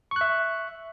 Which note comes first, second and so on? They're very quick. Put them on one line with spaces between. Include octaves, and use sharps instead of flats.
C#6 F#6 E5